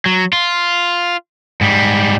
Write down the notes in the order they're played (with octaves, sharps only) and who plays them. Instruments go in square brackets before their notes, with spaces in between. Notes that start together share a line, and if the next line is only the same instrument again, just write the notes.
[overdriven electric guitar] F#3
F4
G#2 G3